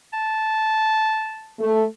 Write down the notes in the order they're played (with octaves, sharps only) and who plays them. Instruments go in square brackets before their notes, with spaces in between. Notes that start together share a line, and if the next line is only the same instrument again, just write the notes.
[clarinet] A5
[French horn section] A3